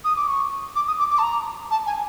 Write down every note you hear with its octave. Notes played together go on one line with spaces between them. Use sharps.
D#6
D6
C#6
D6
D#6
D6
D6
A5
A#5
A5
G#5